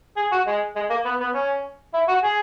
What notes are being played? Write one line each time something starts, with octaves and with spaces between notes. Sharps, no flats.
G#4
F#4
G#3
G#3
A#3
B3
B3
C#4
E4
F#4
G#4